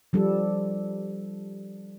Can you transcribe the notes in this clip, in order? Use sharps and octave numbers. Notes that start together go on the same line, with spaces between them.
F3 G3 D4 A4